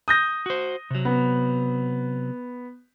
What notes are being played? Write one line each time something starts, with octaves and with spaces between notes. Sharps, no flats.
D#6 G6 A#6
F#4 C5
C3 F#3
B3